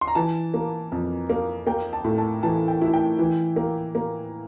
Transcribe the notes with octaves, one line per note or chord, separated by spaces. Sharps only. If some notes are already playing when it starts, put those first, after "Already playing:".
C6
A#5
E3 A5
A#3
F2
A#3
A#3 G5
A5
A2
A5
E3 A5
G5
E4
G5
E3
A#3
A#3